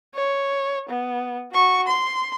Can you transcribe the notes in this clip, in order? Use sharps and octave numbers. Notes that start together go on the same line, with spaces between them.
C#5
B3
F#4 C#6
C6